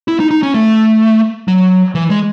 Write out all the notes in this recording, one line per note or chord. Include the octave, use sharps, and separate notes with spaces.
E4
D#4
D#4
C#4
A3
F#3
E3
G#3